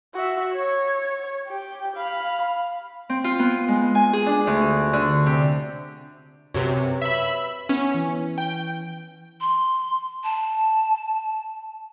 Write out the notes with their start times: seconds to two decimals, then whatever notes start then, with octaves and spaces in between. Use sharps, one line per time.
0.14 F#4 E5
0.54 C#5
1.48 G4
1.96 F5 B5
3.09 C4
3.24 F4
3.39 B3
3.68 G#3
3.95 G#5
4.13 G#4
4.26 D4
4.47 D2
4.93 D3
5.26 C3
6.54 F#2 C3 B4 C#5
7.02 E5 B5
7.69 B3 C#4
7.95 E3
8.38 G5
9.41 C6
10.24 A5